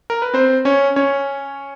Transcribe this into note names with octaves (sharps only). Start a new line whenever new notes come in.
A#4
B4
C4 C5
C#4 C#5
C#4 C#5